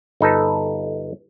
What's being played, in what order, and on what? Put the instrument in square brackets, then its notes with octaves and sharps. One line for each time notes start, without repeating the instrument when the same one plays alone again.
[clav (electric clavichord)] G1 D#4 A4 B4